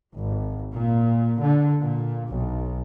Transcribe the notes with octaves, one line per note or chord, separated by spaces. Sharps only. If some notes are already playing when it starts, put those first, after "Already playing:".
G#1
A#2
D3
A#2
B1